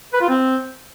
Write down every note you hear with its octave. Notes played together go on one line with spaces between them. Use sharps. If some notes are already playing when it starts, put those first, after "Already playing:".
B4
F4
C4